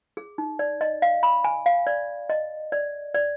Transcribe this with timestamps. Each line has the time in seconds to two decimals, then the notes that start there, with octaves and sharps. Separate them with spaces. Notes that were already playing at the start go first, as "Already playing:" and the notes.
0.17 G#4
0.38 D#4
0.59 D5
0.81 D#5
1.02 F5
1.23 B5
1.44 G#5
1.66 F5
1.87 D5
2.30 D#5
2.72 D5
3.15 D5